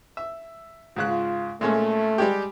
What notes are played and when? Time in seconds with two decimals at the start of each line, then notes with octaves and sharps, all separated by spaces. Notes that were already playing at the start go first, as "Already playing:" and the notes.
0.17 E5
0.96 G#2 C#3 F4 F#6
1.61 A#2 G#3 A3 C#4
2.18 G3 G#3 G4